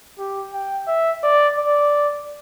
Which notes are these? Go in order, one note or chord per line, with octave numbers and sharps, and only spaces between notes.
G4
G5
E5
D5
D5